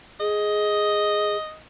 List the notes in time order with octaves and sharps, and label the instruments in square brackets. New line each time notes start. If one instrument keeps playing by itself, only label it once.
[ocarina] G#4 [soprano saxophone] D#5